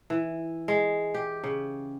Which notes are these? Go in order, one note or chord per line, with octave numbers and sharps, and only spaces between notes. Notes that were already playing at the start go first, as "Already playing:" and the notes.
E3
G#3
G4
C#3